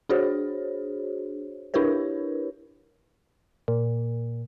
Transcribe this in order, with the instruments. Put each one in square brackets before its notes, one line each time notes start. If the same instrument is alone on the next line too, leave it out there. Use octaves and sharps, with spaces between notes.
[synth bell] D4 F#4 G#4 C5 C#5
D4 E4 G4 A#4 B4 C#5
[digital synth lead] A#2